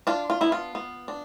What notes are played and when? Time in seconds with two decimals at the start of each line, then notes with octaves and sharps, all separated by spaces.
0.07 D4 F4
0.30 F4
0.41 B3 E4
0.52 F4
0.75 B3
1.08 D4